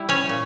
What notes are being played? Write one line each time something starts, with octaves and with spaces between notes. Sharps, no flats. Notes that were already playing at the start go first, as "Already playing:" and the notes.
Already playing: G3 E4
C#4 C#5
A#2